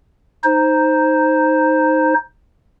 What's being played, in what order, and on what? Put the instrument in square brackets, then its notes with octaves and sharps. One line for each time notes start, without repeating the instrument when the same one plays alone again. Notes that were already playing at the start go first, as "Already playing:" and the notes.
[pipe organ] D#4 C5